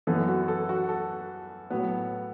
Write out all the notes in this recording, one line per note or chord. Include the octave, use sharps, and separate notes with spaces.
F#2 E3 B3 A4
F#4
A4
F#4
A4
A2 F#3 B3